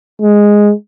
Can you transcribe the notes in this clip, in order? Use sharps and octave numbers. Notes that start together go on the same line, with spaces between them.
G#3